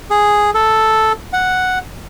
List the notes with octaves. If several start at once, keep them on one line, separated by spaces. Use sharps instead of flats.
G#4
A4
F#5